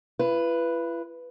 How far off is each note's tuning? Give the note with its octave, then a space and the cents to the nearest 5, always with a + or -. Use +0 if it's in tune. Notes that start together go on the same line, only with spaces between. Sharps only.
E4 +45 B4 +0